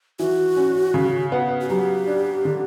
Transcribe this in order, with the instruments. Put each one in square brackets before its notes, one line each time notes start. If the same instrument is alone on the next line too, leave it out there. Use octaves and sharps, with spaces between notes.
[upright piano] E3 [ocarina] F#4
[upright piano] C#4
C#3
B3
[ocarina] F#4
[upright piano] F#3 [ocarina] G4
[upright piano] D4
D3